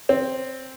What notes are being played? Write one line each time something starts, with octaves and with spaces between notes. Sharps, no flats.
C4